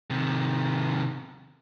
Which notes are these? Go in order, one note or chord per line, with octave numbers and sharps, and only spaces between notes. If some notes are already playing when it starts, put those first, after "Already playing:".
C3 D#3